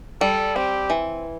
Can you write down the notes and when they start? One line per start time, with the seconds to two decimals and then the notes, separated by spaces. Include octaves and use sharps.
0.21 G3 A4
0.55 C4 G4
0.90 E3